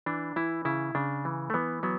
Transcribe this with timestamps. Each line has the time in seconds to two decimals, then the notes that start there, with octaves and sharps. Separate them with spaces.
0.06 E3 D4
0.36 E3 E4
0.65 C#3 E4
0.95 C#3 D4
1.25 E3
1.50 A3
1.54 E3 B3
1.83 F#3 B3